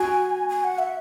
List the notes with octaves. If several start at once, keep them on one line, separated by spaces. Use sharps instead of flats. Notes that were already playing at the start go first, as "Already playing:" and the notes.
Already playing: F#4 G#5
G#5
F#5
E5